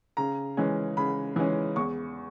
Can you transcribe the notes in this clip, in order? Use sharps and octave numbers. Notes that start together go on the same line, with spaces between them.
C#3 A#5
E3 G#3 C#4
C#3 B5
E3 G#3 C#4
E2 C#6